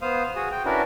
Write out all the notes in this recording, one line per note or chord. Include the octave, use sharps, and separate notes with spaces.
B3 C5 F5 D#6
F#4 G#4 D#6
G5
C#4 D4 E4 F#4 A#4 B4